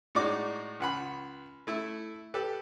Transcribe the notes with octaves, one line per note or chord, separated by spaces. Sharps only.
A2 G#3 D#4 F#4 D5 D6
C#2 F#5 B5
A3 E4 E5
G4 A4 B4